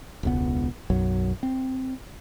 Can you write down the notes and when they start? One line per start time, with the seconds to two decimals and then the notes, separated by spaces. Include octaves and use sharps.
0.23 E1 C#2 B3
0.90 B1 F#2 F#3
1.43 C4